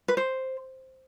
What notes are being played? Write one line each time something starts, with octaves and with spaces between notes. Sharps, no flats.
B4
C5